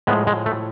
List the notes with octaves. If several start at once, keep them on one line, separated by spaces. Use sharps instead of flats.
A2 F3 G#3 B3
G#3
A3